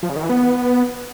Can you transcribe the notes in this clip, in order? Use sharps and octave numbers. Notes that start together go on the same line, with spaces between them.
F3
C#3
D#3
E3
B3